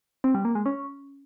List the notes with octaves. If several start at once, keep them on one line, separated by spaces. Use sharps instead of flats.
C4
G3
A#3
G#3
C#4